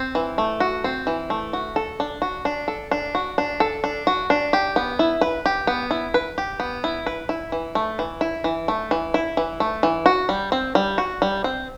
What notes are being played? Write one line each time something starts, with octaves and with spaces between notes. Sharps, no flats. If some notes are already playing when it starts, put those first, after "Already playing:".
Already playing: C4
E3
A3
F#4
C4
E3
A3
F#4
A4
D4
F#4
D4
A4
D4
F#4
D4
A4
D4
F#4
D4
G4
B3
E4
B4
G4
B3
E4
B4
G4
B3
E4
B4
E4
E3
A3
E3
E4
E3
A3
E3
E4
E3
A3
E3
F#4
G3
C4
G3
F#4
G3
C4